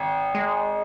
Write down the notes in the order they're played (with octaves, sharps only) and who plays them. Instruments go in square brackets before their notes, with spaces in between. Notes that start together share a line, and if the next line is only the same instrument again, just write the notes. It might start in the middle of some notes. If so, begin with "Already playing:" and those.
Already playing: [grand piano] G#1
[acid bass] G#3